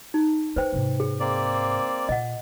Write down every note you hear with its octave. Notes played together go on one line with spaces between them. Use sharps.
D#4
E4 B4 C5 G5
G#2 C3
G#4
A#3 C4 D5
A#2 D#5 F#5